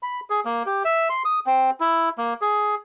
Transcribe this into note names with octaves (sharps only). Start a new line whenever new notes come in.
B5
G#4
A#3
G4
E5
C6
D#6
C4
E4
A#3
G#4